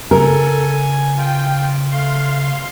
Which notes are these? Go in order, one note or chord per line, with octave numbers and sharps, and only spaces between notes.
C#3 A4 A#4 G#5
F4 G5
A3 F5 C6